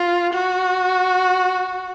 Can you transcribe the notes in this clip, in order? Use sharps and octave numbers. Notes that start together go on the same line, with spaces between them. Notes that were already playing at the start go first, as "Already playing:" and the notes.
Already playing: F4
F#4